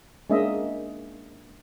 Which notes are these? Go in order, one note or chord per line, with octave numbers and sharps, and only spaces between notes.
G#3 A#3 C#4 D4 D#5 E5